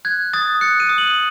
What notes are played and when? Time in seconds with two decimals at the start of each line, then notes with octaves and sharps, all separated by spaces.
0.05 F#6 G#6
0.33 D#6 A6
0.61 F#6 C#7
0.80 D#7
0.89 D#6
0.98 F#7